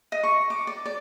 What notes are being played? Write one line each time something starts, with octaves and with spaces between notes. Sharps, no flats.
D#5
C#6
D6
D5
D5